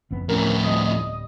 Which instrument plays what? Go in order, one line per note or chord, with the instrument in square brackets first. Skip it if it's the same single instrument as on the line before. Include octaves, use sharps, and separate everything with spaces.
[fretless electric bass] F#1 F2 B3
[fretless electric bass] D1 B3 [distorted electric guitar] F2 A2 [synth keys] C#4 A#4
[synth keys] G3 D#5 D#6